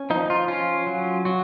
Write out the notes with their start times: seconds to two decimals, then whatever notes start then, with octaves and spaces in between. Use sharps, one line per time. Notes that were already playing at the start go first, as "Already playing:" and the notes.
Already playing: C#4
0.10 F3 D#4
0.30 F4
0.48 C#4 F4
0.87 F#3
1.25 F#3 F#4